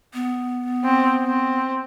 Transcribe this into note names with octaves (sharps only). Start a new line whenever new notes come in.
B3
C4
C4